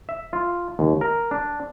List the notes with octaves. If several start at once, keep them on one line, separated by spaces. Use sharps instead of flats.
E5
F4
D#2
A#4
D4